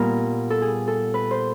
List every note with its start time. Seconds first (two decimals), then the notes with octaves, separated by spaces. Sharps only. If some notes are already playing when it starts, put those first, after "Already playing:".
Already playing: A#2 G3 B3 A#4
0.50 A4
0.62 G#4
0.87 A4
1.14 B4
1.31 C5